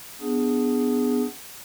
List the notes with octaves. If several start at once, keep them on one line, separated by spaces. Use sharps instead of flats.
B3 D4 G#4